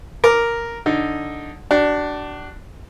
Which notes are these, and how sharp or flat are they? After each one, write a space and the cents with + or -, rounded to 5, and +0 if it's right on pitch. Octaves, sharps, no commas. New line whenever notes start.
A#4 +0 D6 +0
D3 +0 D#4 +0
D4 +0 F#4 +40